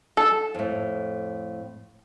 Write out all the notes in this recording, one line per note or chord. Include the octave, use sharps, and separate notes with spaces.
A4
F2 A2